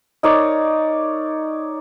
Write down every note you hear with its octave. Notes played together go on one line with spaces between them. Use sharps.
D#4 A#4 C#5 D5